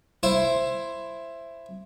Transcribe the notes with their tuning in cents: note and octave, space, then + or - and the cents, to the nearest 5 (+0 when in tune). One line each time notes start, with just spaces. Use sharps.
E4 +15 C5 +5